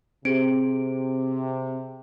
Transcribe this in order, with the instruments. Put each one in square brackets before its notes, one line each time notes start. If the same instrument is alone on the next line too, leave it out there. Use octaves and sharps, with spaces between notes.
[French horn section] C3 [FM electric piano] C4 [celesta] G4 G#4 D7